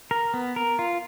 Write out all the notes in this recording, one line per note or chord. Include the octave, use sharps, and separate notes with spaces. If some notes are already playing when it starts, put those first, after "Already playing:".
A#4
B3
A#4
F4